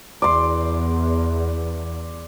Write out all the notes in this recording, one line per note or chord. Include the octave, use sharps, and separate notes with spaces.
E2 D5 C6